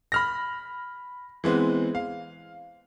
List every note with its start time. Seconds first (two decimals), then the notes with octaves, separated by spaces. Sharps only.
0.12 B5 F6 A#6
1.44 E3 G#3 B3 C4
1.95 F5